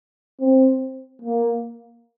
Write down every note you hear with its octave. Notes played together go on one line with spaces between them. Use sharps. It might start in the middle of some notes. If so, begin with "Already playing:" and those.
C4
A#3